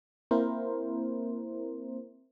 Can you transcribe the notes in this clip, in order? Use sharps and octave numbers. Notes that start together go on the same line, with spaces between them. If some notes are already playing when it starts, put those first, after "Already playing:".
A#3 C4 E4 A#4 C5